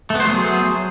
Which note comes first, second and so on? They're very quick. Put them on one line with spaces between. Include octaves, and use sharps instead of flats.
A3 B3 C5 F#3 G#4